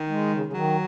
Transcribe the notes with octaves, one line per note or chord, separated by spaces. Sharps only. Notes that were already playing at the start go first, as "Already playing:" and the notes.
Already playing: D#3
G#3
C#3
C#3
D#3 F#3